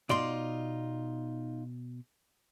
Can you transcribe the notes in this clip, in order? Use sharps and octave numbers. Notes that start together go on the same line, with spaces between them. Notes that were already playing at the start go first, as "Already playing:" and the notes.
B2 D#4 F4 D5 C6